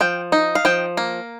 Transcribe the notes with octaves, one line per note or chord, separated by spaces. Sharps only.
F3 G5
D#4
F5
F3 G5
A#3